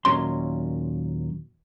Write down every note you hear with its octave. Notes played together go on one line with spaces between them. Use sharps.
D#2 A#2 F#3 C#4 C6